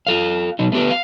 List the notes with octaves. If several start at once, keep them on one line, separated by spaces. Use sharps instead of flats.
F4 A4 F5
B2 F#3 D#4
A3 B3 F#4 G4 B4
F5